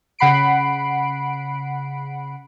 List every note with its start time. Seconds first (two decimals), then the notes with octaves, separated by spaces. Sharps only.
0.19 C#3 F#5 B5 C7 D7